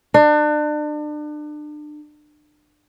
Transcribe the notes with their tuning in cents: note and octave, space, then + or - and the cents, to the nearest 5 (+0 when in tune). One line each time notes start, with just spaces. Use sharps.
D4 +35